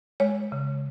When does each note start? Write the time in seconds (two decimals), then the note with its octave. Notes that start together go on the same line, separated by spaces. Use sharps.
0.20 G#3 C#5
0.52 C#3